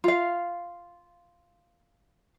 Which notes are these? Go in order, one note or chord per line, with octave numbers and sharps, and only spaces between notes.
F4 F5